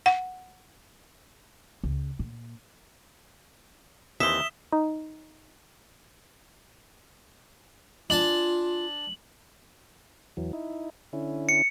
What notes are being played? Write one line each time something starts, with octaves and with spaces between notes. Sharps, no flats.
F#5
C#2
A#2
D#2 E3 C4 E5 D#6 B6 E7 G7
D#4
D4 F4 G#5 A5 F#7
E2 E3 F#3
D#4 E4
D3 C#4 E4
C#7